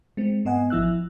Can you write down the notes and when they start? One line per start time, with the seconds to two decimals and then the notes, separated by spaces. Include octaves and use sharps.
0.17 G#3 C4
0.45 G#2 B3 D#5 F#5 G#5
0.70 G#1 F3 E4 E6 F#6